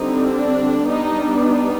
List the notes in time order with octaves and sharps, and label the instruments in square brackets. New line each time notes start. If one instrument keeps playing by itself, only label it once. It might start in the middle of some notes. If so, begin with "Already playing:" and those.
Already playing: [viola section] D3 G3 C4 D#4
D4
G3 B3 D4 D#4
D#4